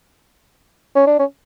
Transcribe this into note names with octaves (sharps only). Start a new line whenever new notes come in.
C#4
D4
C#4